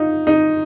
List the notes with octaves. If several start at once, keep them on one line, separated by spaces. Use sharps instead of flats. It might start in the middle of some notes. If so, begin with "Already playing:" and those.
Already playing: D#4 F4
D#4